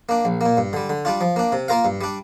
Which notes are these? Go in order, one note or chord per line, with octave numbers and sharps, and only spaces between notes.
A#3 D4
A#1
A#2 A#3
G2
D3 G3
D3
G3 D4 F4
F3
A#3 D4
C3
A#3 F4 A#4 F5
G2
G3 D4